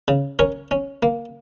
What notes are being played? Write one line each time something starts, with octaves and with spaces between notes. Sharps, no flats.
C#3
C#4 A#4 C#5
C#4
A#3